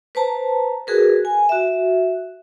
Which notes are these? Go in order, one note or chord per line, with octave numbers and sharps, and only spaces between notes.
B4 C5 A5 A#5
F#4 G#4 A#4 B4
G#5
F#4 E5